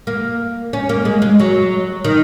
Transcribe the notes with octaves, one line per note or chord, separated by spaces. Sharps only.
A#3
C#4
A#3
G#3
G#3
F#3
D#3